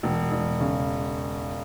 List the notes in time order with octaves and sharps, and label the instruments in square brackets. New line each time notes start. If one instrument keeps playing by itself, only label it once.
[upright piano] E1
E1
C#3